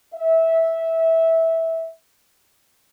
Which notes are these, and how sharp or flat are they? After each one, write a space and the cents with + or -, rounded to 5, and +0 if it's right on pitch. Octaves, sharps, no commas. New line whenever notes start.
E5 -15